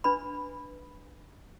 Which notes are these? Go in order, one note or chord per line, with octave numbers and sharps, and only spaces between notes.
D4 B4 B5